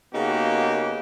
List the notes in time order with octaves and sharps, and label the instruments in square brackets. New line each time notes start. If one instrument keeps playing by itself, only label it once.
[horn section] C#3 A#3 B3 D#4 F#4 G4